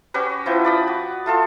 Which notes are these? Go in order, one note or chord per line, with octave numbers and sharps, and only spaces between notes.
C#4 F#4 G4 B4
F3 E4 B4 G5
D5 B5 D#6
F#4
A3 F4 A4